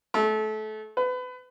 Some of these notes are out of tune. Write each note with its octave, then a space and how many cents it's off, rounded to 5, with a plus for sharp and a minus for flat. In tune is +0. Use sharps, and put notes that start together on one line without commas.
A3 -25
B4 +30